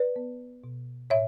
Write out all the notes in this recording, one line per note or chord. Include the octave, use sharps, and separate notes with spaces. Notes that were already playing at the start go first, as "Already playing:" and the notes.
Already playing: B4 D5
B3
B2
A2 C#5 E5